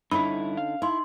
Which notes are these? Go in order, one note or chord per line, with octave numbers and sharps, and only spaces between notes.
G2 D3 C#4 D#4 E4 B5
F5
D#4 E4 C6